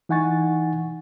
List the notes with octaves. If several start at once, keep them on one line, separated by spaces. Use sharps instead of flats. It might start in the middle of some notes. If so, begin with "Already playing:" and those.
E3 D#4 F#5 G#5 C#6 A6